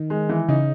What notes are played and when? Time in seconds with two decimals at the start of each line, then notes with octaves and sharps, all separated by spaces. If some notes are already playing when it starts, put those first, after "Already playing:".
Already playing: D#3
0.10 G#3
0.29 E3
0.48 C#3 D#4